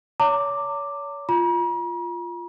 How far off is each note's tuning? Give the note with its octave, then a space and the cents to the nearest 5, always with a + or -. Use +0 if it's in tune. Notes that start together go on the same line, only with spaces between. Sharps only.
C#5 +35 A#5 -35 D6 +0
F4 -5 A#5 +45